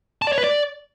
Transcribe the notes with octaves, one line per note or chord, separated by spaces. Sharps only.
A5
D5
C#5
B4
D5